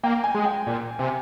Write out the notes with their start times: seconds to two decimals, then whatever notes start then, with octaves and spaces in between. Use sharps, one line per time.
0.03 A#3 G5
0.24 G#5
0.35 G#3
0.45 G5
0.67 A#2
0.99 C3